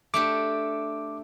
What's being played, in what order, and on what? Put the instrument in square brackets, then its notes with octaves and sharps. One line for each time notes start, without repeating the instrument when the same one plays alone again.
[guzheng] A3 D4 G4 [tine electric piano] D6